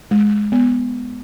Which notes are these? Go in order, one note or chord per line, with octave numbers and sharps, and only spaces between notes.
G#3
B3